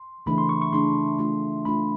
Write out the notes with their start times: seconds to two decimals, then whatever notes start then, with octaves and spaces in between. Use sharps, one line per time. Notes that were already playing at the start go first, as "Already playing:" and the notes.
Already playing: C6
0.26 C#3 E3 A3 D4 B5
0.38 C6
0.49 C#6
0.62 C#6
0.73 C#3 E3 A3 D4 C6
1.19 A3 D4 F4
1.65 A3 D4 F4 B5